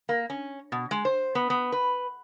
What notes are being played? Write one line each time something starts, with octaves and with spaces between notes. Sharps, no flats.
A#3
C#4
B2
G#3
C5
B3
B3
B4